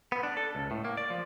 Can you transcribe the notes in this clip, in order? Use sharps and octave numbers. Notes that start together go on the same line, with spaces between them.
B3
D4
A4
C#2
A2
A#3
D5
F3